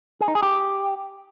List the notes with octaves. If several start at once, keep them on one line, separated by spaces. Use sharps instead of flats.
G#4
D#4
G#4
G4